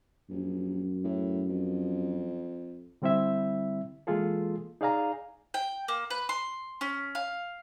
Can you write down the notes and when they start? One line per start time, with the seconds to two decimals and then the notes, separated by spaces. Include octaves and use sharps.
0.30 A#1 F#2
1.04 A2
1.49 F2
3.02 D3 G3 C4 E4 E5
4.07 E3 G#3 A#3 F4 G#4 A4
4.81 D#4 G#4 D5 F5 G#5 A#5
5.54 G5
5.88 A#3
6.10 B4
6.29 C6
6.81 C#4
7.15 F5